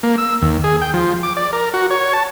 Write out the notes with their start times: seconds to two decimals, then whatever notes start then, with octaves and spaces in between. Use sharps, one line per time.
0.03 A#3
0.18 E6
0.42 D#2
0.64 G#4
0.82 G5
0.94 F3
1.23 D6
1.37 D5
1.53 A#4
1.74 F#4
1.90 C#5
2.13 A5